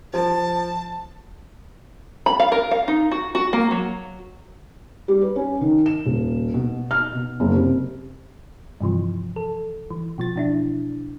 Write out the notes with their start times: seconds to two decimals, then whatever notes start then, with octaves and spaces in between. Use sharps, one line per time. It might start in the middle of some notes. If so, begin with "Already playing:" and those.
0.13 F3 A5
2.26 B5
2.40 F5
2.52 A#4
2.71 F5
2.88 D#4
3.11 F#4
3.35 F#4
3.53 A#3
3.71 F#3
5.08 G3
5.21 B4
5.36 C#4
5.61 D#3
5.86 E7
6.05 D#1
6.54 B2
6.91 F6
7.13 B2
7.40 F#1
7.55 C3
8.81 G2 C3 E3 F3
9.36 A4
9.90 E3
10.18 B2 F3 A6
10.36 B2 D4 E4